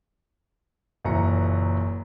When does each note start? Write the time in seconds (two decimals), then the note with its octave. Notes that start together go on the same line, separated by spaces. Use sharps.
1.05 F#1 F#2 A#2 E3 A#5 C#7